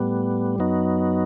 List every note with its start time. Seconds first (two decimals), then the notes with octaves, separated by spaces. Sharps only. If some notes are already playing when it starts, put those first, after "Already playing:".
Already playing: A2 G3 B3
0.58 F#2 F#3 B3 D#4